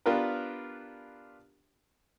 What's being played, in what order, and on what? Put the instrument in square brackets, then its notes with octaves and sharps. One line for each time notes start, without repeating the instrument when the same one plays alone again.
[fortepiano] B3 D4 F4 G4 A#4 B4